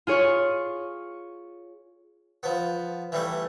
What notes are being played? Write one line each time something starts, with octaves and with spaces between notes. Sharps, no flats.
F4 G#4 C#5 C#6
F3 B3
E3 G3 A3